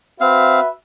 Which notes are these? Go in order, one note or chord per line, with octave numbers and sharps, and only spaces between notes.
C4 F#4 B4 E5 F5